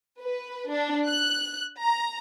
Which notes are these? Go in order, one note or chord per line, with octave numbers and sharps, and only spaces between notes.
B4
D4
F#6
A#5